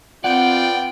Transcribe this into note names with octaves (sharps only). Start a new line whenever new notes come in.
B3 C4 F4 D5 F#5 G5